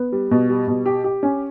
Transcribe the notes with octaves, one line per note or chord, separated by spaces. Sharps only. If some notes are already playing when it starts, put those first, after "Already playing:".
Already playing: B3
G3
B2
G3
B2
G4
G4
C#4